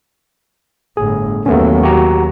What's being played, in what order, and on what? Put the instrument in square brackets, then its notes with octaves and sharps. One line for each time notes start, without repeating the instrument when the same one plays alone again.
[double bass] G1 A2 [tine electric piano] G#4
[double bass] D#2 F#3 [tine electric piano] A3 B3 C#4
[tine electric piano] F#4 G4 A#5